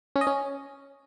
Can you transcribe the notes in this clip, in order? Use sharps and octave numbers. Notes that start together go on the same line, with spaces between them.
C#4
D#5
C#4